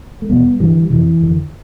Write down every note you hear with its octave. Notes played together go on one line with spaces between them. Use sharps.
A3
E2 B2 G3 B3
G2 D3 E3 G3
F2 C3 E3
F2 D3